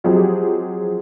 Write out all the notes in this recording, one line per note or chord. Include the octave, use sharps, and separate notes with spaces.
F3 F#3 G#3 C4 G4 G#4